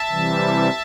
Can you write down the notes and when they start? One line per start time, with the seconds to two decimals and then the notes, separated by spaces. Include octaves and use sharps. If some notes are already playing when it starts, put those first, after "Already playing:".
Already playing: E5 A5
0.10 C3 E3 G3